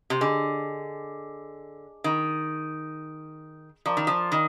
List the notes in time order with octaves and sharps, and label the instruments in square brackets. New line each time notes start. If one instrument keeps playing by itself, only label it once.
[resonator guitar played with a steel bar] C3
[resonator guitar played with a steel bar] D3 [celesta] G#4 D#5 G#5 D6
[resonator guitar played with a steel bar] D#3
[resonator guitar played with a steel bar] F3 [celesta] A#4 D5 F5 A#5 D6
[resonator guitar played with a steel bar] D#3
F3
D#3